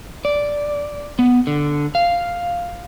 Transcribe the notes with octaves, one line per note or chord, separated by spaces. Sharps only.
D5
B3
D3
F5